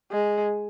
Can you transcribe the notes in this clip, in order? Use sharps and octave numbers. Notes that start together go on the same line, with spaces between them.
G#3